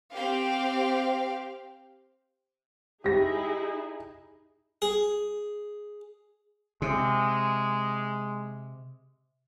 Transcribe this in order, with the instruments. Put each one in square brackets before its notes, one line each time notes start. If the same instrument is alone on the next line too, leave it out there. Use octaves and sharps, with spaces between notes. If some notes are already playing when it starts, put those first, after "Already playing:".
[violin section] C4 G4 F5 G5
[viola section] D#4 E4 G#4 [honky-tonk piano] G4 A#6
[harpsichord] G#4
[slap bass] C3 [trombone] G#3